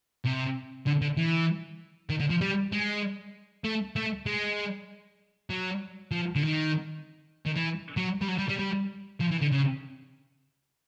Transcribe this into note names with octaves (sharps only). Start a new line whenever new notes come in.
C3
D3
D3
E3
D#3
D3
F3
G3
G#3
A3
A3
G#3
F#3
F3
D3
D#3
D#3
E3
F#3
G3
F#3
G3
G3
G3
F3
E3
D3
C#3